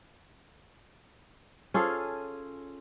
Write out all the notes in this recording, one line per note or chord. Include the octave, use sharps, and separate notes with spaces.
C#4 F4 G#4 A4